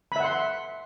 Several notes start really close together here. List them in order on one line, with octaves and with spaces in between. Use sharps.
B5 E5 F#5 C6